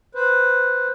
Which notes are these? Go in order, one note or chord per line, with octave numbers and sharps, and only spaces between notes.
B4 C5